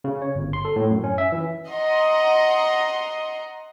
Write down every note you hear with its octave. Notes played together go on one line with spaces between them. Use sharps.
C#3
C#5
G1
C6
A4
A2
F#2
C#4
E5
E3
D#5 F#5 A#5 C6